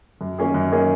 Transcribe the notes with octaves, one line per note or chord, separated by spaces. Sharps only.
F#2
D#3 A#3 C#4 G#4
F#2
D#3 A#3 C#4 G#4